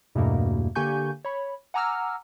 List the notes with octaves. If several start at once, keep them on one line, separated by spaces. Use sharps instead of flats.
E2 G2 B2 A3 A#3
D3 A#3 G4 G#5 C#6 G6
C#5 B5
F#5 G#5 A#5 D6 E6 F6